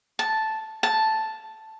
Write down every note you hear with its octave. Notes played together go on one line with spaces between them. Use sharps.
A5
A5